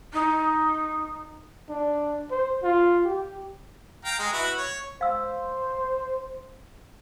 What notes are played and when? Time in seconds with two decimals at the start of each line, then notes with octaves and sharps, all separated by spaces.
0.13 D#4
1.69 D4
2.31 C5
2.63 F4
3.05 G4
4.05 F5 G5 A#5
4.19 G#3 G#4
4.33 E4 F#4 B4
4.58 C#5
5.01 C5 F5 E6